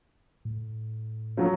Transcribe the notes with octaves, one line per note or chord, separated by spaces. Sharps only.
A2
F3 F#3